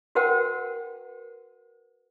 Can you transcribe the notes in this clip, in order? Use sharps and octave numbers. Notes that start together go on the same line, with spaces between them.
F#4 A#4 B4 F#5 G5